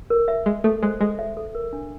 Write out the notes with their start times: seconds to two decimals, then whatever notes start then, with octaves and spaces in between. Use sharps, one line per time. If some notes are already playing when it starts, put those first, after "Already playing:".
0.10 A#4
0.28 E5
0.46 G#3 E5
0.64 A3 A4
0.83 G#3 C5
1.00 G#3 A4
1.19 E5
1.37 A4
1.55 A#4
1.73 D4